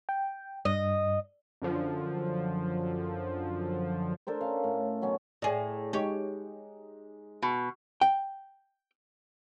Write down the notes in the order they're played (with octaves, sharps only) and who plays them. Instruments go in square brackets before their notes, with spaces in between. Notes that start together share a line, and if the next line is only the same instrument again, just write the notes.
[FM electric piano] G5
[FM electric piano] G2 [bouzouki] D#5
[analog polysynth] F#2 D3 F3
[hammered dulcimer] D4 A4 A#4 C5
C#4 F5
A2
B2 F#3 C#4
[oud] A2 G#4 [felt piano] D5 G5
[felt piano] G#3 D#4 [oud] G4 C#5
[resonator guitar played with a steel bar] B2
[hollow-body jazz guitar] G5